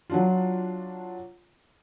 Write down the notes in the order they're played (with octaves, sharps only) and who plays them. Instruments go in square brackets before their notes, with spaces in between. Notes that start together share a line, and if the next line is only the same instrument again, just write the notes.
[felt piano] F#3 D4 F4